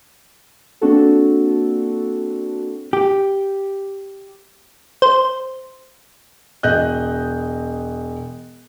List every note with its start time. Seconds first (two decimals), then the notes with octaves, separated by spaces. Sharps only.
0.81 A#3 C4 D4 F#4 A4
2.93 G4
5.02 C5
6.63 E1 D#5 F#6 G6